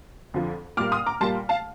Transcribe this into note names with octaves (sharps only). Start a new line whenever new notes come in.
F2 D3 F3
A#2 G3 A#3 D6 F6
C6 D#6
A#5 D6
A#2 G3 A#3 A5 C6
F5 A5